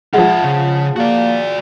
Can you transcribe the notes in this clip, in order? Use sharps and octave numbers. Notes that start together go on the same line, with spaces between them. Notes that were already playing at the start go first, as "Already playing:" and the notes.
F3 G#3 F4 E5 F#5
C#3
A#3 F#4 D5